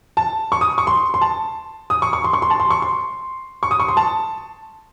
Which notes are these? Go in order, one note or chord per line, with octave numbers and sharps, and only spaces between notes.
A5
C#6
D#6
C#6
C6
C6
A5
D#6
C#6
C#6
C6
C#6
C6
A5
C6
C#6
C6
C#6
D#6
C#6
C6
A5